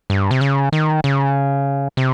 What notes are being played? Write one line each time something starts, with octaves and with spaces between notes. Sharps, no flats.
G2
C3
C#3
D#3
C#3
C3